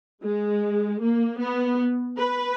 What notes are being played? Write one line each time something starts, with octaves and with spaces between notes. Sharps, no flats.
G#3
A#3
B3
B4